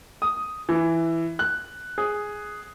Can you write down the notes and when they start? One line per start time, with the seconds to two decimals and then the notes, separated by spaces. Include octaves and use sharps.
0.22 D#6
0.69 E3
1.39 F#6
1.98 G#4